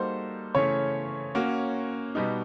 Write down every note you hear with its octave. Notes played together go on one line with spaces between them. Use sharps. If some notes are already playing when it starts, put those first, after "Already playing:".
Already playing: G3 A#3 D#4 F#4 A4 C5
C#3 E3 A3 C#4 C#5
A#3 C#4 F#4
B2 G3 B3 D#4